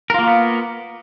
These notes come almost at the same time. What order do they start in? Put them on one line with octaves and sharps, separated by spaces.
A#4 F4 A#3 F#4 B3